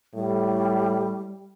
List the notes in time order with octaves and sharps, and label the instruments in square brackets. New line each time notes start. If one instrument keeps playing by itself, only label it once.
[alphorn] A2 [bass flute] G3